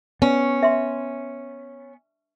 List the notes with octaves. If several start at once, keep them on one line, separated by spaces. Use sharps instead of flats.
B3 C#4
E5 C6